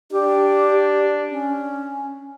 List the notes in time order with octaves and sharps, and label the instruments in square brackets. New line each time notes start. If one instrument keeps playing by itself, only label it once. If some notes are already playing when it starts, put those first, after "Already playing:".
[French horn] D4 [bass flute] G4
[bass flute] C#4